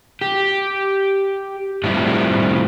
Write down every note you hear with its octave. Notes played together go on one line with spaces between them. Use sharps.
G4
A2 F3 G3 A3 C4 E4